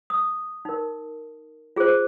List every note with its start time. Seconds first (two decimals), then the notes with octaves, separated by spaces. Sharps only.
0.10 D#6
0.65 D#4 A#4
1.76 F4 G#4 C5